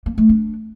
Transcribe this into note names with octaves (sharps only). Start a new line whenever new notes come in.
A#3
A3
D4